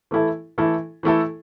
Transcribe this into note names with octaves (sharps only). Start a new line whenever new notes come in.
E3 A3 E4 A4
E3 A3 E4 A4
E3 A3 E4 A4